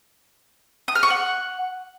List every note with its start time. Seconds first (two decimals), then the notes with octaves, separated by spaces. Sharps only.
0.88 D#6
0.95 F6
1.03 C#6
1.10 F#5